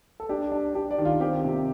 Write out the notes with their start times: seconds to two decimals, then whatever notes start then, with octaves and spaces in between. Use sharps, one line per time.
0.20 A4
0.29 D4 G4
0.52 D4
0.75 D4 G4
0.91 D5
0.98 D#3
1.05 F4
1.20 C4 G4
1.44 C3